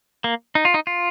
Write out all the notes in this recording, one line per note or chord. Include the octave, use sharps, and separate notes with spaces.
A#3
D#4
F4
D#4
F4